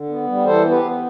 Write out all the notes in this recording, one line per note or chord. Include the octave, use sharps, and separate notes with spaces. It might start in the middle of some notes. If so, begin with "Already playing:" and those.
Already playing: D3
B3
G3
E3 A4 C5
B3
G4 B4
B3